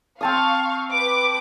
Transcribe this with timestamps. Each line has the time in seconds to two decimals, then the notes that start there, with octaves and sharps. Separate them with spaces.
0.21 C4 F5 A5 C#6 D#6
0.90 B4 D6